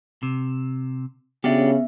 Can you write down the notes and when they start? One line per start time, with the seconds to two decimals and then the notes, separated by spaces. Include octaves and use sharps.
0.23 C3
1.44 C#3 B3 D4 F#4 G4 E5